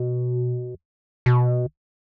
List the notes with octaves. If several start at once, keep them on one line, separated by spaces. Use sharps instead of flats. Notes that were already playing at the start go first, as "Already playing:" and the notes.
Already playing: B2
B2